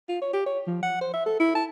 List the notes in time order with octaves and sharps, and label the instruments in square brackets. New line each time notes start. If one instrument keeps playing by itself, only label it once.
[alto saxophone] F4
C#5
G4
C#5
F3
F#5
C5
E5
A4
E4
A5